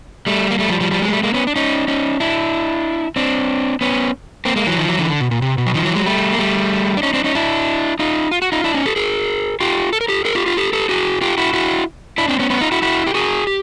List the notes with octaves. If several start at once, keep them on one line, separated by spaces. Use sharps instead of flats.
G3 A3
A#3
G3 A3
F3 G3
F3 G3
F3 G3
F#3 G#3
A#3
G3 A3
G#3 A#3
B3 C#4
D4
C#4 D#4
C#4 D#4
D4 E4
C4 D4
B3 C#4
A#3 C4
G#3 A#3
E3 F#3
D#3 F3
E3 F#3
D3 E3
D3
B2
A#2
C3
B2
F#3
D#3 F3
E3 F#3
F#3 G#3
G3 A3
A#3
G3 A3
D4
C#4 D#4
C4 D4
C#4 D#4
D4 E4
D#4 F4
F4
F#4
D#4 F4
D4 E4
C#4 D#4
G4 A4
G#4 A#4
F4 G4
A4
A#4
G4 A4
G#4 A#4
F4 G4
F4 G4
G4 A4
G4 A4
F#4 G#4
F4 G4
E4 F#4
E4 F#4
D4 E4
C4 D4
B3 C#4
B3 C#4
D#4 F4
E4 F#4
E4 F#4
G4
F#4 G#4
G4